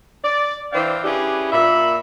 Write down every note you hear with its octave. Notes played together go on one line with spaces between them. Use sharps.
D5
E3 D4 C5 D5 F5 G5
C#4 D4 E4 G4 G#4 B4
A#2 E5 B5